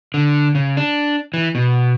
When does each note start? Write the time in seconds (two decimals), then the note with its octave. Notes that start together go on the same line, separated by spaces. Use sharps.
0.14 D3
0.55 C#3
0.77 D4
1.34 E3
1.55 B2